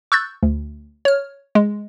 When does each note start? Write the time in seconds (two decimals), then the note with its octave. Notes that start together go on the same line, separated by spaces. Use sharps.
0.12 C#6 E6 F#6 G6 A6
0.43 D2
1.05 C#5 F6
1.55 G#3